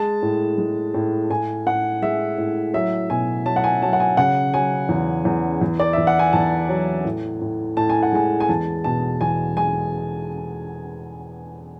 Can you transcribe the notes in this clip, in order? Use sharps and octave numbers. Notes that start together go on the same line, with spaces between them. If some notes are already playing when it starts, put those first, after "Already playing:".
Already playing: G#3 A5
A2
G#3
A2
A2 G#5
A2 F#5
G#3 E5
A2
F#3 E5
B2 G#5
F#3 A5
F#5
G#5
F#3 A5
F#5
G#5
C#3 F#5
F#3 G#5
E2
E2
E2
D5
E2 E5
F#5
G#5
E2 A5
F#3
A2
A2
A2 A5
G#5
F#5
G#3 G#5
G#5
E2 A5
B2 A5
E2 G#5
G#3 G#5